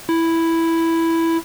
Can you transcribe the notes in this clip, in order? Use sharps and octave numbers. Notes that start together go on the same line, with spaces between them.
E4